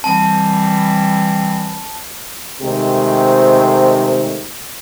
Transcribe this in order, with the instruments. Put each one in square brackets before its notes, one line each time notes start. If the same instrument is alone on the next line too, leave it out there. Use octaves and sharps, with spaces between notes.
[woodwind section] E3 G3 C4 [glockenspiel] A5
[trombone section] C3 D#3 G#3 A3 C4